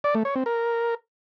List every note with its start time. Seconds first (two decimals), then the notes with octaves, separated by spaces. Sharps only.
0.04 D5
0.15 A3
0.25 C#5
0.35 C4
0.46 A#4